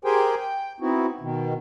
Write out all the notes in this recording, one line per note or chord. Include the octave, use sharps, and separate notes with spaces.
G4 G#4 A#4 C5 G5 G#5
G5
B3 C4 D#4 E4 F#4
B2 D#3